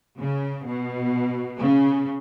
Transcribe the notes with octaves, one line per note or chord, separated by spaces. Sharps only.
C#3
B2
C#3